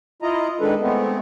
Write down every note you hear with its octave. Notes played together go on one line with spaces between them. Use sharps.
E4 F4 D#5 A#5
D#3 G#3 D4 A4 B4
G#3 A3 B3 C4